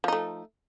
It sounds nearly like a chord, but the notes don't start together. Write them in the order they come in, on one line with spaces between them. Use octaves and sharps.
F3 D#4 A3